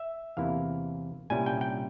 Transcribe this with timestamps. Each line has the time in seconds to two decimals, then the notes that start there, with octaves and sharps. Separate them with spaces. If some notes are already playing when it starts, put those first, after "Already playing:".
Already playing: E5
0.37 E2 C3 E3 A#3 E4 F5
1.30 C2 A#2 G3 C#4 E4 G#5
1.46 G5
1.61 G5